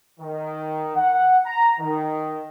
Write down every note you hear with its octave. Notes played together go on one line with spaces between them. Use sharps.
D#3
F#5
A#5
D#3